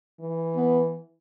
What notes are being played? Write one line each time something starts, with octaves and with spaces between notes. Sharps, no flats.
E3
B3